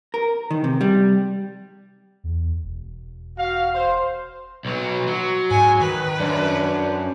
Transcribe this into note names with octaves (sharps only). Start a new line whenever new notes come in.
A#4
D#3
C3
G3
E2
E1
F#4 F5
C5
B1 F#3
F#3
G#2 G#5
D#3 B4
F#2 D4